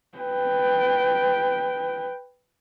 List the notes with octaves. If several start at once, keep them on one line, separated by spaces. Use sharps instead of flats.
B4 G5